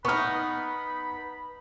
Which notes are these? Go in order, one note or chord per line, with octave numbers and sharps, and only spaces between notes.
B3 D#4 B5 C#6 F6